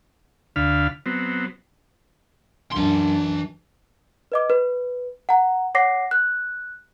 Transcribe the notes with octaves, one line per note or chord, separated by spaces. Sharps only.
D2 D3 F5 B5 F6
F#3 B3 C4
F#2 E3 D4 C6
B4 D#5 D6
B4
F#5 A#5
C#5 F#5 D6 A#6 C7
F#6